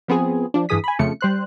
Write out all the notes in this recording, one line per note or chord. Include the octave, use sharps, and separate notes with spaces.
F3 B3 C4 G#4
F3 D4
G2 E3 G#4 D#6 B6
G#5 B5
F2 C#3 A3 C#7
G3 C5 F#6